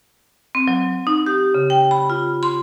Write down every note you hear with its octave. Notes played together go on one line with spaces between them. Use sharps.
C4
F#3
D#4
G4
C#3
G5
B5
F4
C6